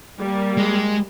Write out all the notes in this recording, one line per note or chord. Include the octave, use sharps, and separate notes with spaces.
G3 A#3
G#3